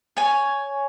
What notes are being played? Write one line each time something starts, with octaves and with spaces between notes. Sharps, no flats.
C#5 G#5